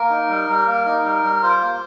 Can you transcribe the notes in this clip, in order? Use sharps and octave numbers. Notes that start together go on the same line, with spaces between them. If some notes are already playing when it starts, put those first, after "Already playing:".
Already playing: A#3 A#4
D#4
G3
G3
A#3
D#4
G3
G3
F4 C5
A#3